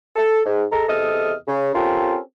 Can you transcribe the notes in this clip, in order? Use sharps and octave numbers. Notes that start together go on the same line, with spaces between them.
A4
G#2
G#3 A4 A#5
E2 C3 A4 D#5 D#6 F6
C#3
C4 C#4 F4 G4 A4 A#4